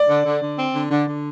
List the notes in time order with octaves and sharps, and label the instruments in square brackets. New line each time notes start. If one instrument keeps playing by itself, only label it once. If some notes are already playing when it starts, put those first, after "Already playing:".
Already playing: [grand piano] D5
[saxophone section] D3
D3
D3
C4
D3
D3
D3